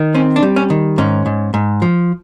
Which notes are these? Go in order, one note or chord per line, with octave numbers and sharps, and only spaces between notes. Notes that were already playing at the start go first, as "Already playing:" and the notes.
Already playing: D#3
C4 C#4
D4
G3
C#4
D#3
G#2 C#4
G#2
G#2
F3